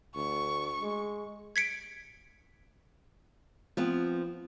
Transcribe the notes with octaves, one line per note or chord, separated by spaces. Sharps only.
D2 C#6
G#3
G#6 B6 C#7 D7
F3 B3 C4